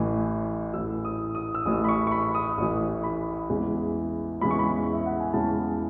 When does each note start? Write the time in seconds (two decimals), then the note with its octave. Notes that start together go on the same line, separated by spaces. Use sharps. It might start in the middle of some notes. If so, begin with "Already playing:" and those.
Already playing: A1 A2 E3
0.74 A1 A2 E3 E6
1.05 D#6
1.35 D#6
1.55 E6
1.65 A1 A2 E3 D#6
1.84 B5
1.88 C#6
2.07 C#6
2.11 B5
2.35 D#6
2.58 A1 A2 E3 D#6
3.03 B5
3.49 E2 C#3 E3 G#3
4.41 E2 C#3 E3 G#3 B5
4.51 C#6
4.59 B5
4.93 E5
5.06 F#5
5.20 G#5
5.33 E2 C#3 E3 G#3 A5